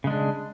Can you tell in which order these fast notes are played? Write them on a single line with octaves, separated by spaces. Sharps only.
C#3 G#3 D4